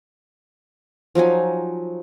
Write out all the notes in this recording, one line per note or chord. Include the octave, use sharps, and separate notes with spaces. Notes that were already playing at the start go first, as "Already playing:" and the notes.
F3 F#3 D#4 G#5